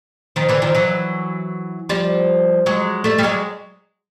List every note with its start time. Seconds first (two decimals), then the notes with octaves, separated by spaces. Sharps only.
0.36 D#3 F3
0.49 D3 E3
0.62 D#3 F3
0.75 E3 F#3
1.89 F3 G3
2.66 F#3 G#3
3.04 G3 A3
3.18 G3
3.23 F#3 G#3